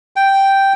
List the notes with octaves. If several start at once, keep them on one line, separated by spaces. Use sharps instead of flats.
G5